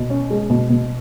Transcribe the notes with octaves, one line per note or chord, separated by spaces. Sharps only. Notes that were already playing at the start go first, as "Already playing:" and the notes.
Already playing: B2
C#4
G#3
B2
B2